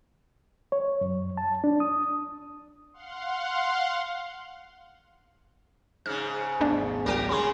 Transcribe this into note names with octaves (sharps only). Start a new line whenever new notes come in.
C#5
F#2
A5
D4
D#6
F5 F#5 C6
G#2 C#3 F6
G#1 A3 B3 C#4 D4 D5
C#2 F#3 G4 A#4 G5
C#3 C#4 G#4 B5 C6